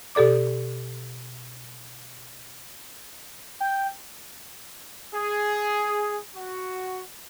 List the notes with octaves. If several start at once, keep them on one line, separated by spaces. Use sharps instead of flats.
B2 G4 A4 D5 D6
G5
G#4
F#4